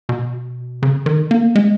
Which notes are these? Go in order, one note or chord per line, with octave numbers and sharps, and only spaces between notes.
B2
C#3
D#3
A#3
G#3